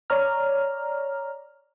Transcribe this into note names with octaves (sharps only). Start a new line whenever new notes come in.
C#5 D5 A#5 F6